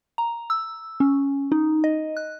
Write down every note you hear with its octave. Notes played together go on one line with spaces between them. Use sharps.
A#5
E6
C#4
D#4
D#5
F#6